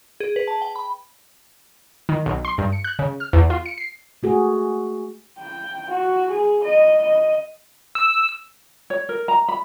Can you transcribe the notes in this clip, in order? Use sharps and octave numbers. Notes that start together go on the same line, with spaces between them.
G#4
B4
A5
G5
B5
D#3
B1
C6
G2
C#7
F#6
C#3
F6
E2
F4
C#7
C7
A3 F#4 G#4
G5
F#4
G#4
D#5
D#5
E6
C#5
A#4
A#5
B5